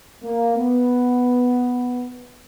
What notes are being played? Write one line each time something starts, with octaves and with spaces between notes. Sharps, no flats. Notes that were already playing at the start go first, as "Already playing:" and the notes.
A#3
B3